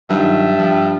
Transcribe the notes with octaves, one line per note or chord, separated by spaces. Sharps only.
G2 D#3 F#3 F4 E5
F3 G5